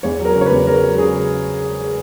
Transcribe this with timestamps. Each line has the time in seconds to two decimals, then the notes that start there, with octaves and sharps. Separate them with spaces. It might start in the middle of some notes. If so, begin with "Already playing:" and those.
0.03 E2 C#5
0.20 F#3 A#4
0.35 C#3
0.41 C#5
0.46 B4
0.51 E2
0.67 E2 A#4
0.83 F#3
0.98 C#3 G#4